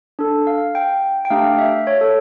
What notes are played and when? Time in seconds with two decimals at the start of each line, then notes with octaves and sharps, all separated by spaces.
0.19 D4 A4
0.47 F5
0.75 G5
1.25 G5
1.30 A3 D4 G4 F5
1.58 E5
1.87 C#5
2.01 A4